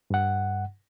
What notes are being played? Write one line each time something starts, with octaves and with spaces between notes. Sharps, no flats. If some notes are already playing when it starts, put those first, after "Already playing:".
G2 F#5